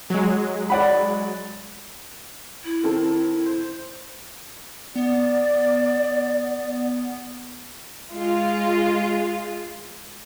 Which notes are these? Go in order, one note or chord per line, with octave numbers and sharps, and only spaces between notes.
F#3 G#3
D5 F#5 B5
E4
D#3 C4 A4
C5
B3 D5
G#3 F4